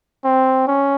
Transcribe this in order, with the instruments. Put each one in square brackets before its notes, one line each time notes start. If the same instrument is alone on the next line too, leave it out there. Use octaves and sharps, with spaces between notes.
[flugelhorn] C4
C#4